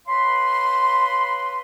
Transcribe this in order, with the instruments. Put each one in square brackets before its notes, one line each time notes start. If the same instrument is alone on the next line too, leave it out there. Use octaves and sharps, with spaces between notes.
[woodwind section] B4 C#5 F5 B5 C6